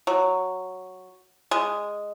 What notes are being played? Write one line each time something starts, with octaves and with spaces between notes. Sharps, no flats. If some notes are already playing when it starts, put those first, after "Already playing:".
F#3
G#3